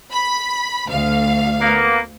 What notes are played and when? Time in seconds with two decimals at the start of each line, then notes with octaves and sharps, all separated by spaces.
0.11 B5
0.88 D2 F5
1.60 A#3 B3